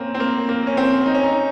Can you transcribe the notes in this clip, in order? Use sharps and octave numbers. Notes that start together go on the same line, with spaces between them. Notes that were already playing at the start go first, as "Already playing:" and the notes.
Already playing: A#3 C4 C#4
C4
A#3
A#3
C#4
C4
D#4
C#4
D#4